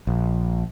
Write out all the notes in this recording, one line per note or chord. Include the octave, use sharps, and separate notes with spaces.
A#1